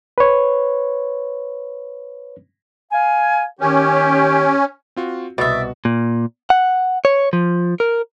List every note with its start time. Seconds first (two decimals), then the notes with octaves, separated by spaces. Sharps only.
0.18 B4 C#5
2.92 F5 G#5
3.61 D#2 D#3 C#4 G4
4.96 C4 F4 F#4
5.38 C2 B2 F#4 D5 E5
5.85 A#2
6.50 F#5
7.05 C#5
7.33 F3
7.80 A#4